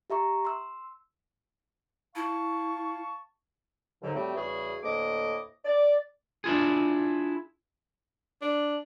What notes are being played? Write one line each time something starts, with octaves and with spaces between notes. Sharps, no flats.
G4 E5 A#5 C#6
C6 E6
E4 F5 A5 C#6
D#2 G#2 D3 F#3
A2 F#3 G3 A3 C4 G4
E2 C#3 G3 F#4 G#4
D2 A2 A#3 D#5 D6
D5
D4 E4 F4 G#4
D4